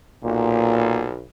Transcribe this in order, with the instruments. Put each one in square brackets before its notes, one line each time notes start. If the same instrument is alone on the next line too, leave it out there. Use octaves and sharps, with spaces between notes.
[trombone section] B1 [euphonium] A#2